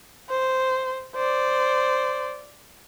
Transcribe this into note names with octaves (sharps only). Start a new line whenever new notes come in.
C5
C5 D5